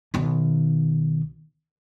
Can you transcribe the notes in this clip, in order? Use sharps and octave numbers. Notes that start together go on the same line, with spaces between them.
B1 D#3